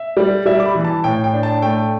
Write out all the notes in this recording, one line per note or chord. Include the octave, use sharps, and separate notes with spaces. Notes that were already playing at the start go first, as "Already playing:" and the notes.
Already playing: E5
G3
G3 E5
D6
B5
E3
A5
A2 G5
G5
D4
A5
A3 G5